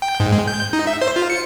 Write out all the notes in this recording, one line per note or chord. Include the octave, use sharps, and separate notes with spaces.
G5
G#2
G#3
G6
D#4
E5
C5
F4
C#7